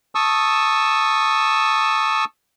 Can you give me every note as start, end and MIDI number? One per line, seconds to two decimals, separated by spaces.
0.15 2.25 81
0.15 2.25 85
0.15 2.25 87
0.15 2.25 88